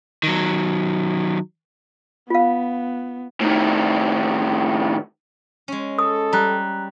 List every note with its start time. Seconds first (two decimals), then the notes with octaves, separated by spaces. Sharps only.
0.23 D#3 F#3
2.30 B3 F4 F5
3.41 A2 D#3
5.68 G#3 C#4
5.99 A4 D#6
6.33 G3 A#5 F#6